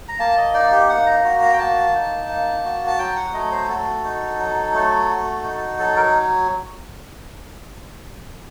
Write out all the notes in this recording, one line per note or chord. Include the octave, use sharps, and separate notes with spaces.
A#5
A#3 A5
D#5
D#4 D5
G4
A#3 F#5
A#5
F#4 A#5
A#5
G5
A#3 A5
D#4
A#3
F#4
A5
F#3 G5
F#5
A3 D#5
C5
F#4 A4
D#4
F#3
A3
F#4
D#4
F#3 A4
A#4